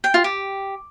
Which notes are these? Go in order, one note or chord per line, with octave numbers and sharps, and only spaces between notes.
G5
F4
G4